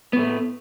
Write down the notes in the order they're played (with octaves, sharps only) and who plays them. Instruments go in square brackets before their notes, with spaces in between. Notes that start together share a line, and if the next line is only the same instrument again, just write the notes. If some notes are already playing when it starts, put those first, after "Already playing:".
[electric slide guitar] B3
A2
A3